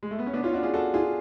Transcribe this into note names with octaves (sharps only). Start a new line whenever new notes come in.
G#3
A3
B3
C#4
B3 D4
C#4 F4
D4 F#4
F4 G#4
F#4 A4
F4 G#4